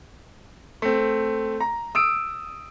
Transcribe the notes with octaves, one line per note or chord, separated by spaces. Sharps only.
A3 C4
A#5
D#6 E6 D7